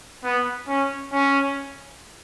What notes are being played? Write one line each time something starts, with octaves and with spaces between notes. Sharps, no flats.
B3
C#4
C#4